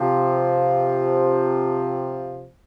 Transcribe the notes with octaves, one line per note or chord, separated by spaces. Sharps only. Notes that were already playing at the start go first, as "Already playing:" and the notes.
Already playing: C3 F3